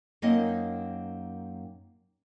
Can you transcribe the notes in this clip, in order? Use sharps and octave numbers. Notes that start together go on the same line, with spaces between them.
F#2 A#3 C4 D#4 D#5